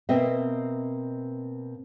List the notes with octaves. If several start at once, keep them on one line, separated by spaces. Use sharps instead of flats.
B2 A#3 C4 D#5 E5